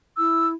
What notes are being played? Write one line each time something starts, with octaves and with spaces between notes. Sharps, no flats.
E4 E6